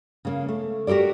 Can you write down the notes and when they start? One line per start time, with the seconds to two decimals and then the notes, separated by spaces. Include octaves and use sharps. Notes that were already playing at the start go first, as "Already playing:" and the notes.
0.25 C#3 A#3
0.49 A3
0.87 F#4 G4 A4 A#4 D5